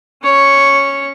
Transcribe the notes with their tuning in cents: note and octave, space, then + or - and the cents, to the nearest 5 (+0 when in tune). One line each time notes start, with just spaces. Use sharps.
C#4 +0 C#5 +0